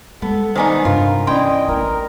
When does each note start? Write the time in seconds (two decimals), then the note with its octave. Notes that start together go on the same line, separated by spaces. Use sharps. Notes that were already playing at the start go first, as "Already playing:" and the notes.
0.22 G3 G#3 B3 A4
0.55 D#3 B3 D#4 C5 D5 G#5
0.85 G2 C3 F4 A#4
1.27 E3 C#4 D5 D#5 G5 C6
1.68 A1 E4 A#4